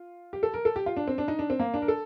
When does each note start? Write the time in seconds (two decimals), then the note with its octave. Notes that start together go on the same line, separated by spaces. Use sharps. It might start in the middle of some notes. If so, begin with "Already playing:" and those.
Already playing: F4
0.33 G4
0.43 A4
0.54 A#4
0.65 A4
0.76 G4
0.86 F4
0.97 D4
1.08 C4
1.18 D4
1.28 D#4
1.39 D4
1.50 C4
1.60 A#3
1.74 D4
1.82 A#4
1.88 A4